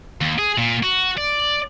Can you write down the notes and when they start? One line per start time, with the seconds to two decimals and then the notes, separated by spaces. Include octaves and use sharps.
0.21 D#2
0.38 G#4
0.58 A#2
0.83 F#4
1.18 D5